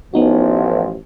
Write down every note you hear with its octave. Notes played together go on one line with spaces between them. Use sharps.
A1 F3 B3 D#4 F#4